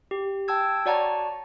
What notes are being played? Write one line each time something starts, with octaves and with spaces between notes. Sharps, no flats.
G4
G5 A5 E6 G#6
F#4 C#5 D5 F#5 A5 A#5